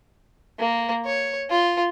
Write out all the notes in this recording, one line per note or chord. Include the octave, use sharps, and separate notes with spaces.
A#3
C#5
F4